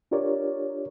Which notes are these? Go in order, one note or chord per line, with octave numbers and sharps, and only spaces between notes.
D4 F4 G4 A#4 C#5 D5